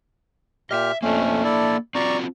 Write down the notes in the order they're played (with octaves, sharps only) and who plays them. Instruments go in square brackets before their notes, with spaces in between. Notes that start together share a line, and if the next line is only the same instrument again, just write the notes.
[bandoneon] A#2 G4 F6 [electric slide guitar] D#5 E5
[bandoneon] F2 A3 C#4 [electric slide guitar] A#3 D4
[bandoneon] E4 A4 D5
[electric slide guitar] C4 F4 F#4 [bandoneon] D5 A#5 C#6